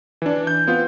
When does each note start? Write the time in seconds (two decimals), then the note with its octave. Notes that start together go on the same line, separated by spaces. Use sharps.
0.22 E3 D4
0.47 G6
0.67 B3 C4 F4